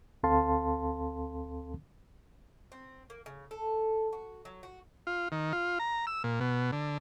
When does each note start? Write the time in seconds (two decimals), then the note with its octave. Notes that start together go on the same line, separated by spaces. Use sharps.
0.23 D2 C4 A4 F5 A5 C6
2.72 C4
3.10 A#3
3.26 C#3
3.51 A4
4.13 F#4
4.45 F#3
4.63 F#4
5.07 F4
5.32 D#3
5.53 F4
5.79 A#5
6.07 E6
6.24 A#2
6.40 B2
6.73 D3